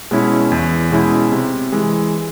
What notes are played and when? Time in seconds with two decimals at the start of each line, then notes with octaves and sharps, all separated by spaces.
0.11 B2 G#3 C#4 E4
0.52 E2
0.91 B2 G#3 C#4 E4
1.32 C3
1.72 E3 G#3